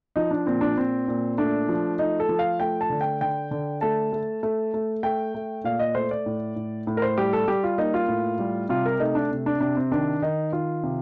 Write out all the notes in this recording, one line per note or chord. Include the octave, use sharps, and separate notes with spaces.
F3 D#4
D4
A#2 C4
D4
A#2 C4
A#2
A3 D4
F3
A3 D#4
A4
F3
F5
A3 G5
A5
D3
G5
D3 G5
D3
A3 A5
A3
A3
A3
A3 G5
A3
A#2 F5
D#5
A3 C5
D5
A2
A2
A2
A#4
C5
G3 G4
A4
G3 G4
F4
A#3 D#4
F4
A2
G3
C3 F4
A#4
A3 D#4
D4
C3
D4
C3 D4
C4
D#3 D4
D#3 D#4
D#3 F4
C3